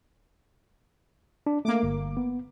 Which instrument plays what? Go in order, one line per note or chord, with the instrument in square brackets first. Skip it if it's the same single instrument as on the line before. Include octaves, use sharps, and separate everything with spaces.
[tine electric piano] D4
[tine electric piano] A3 [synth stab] A#3 D6
[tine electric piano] G1
B3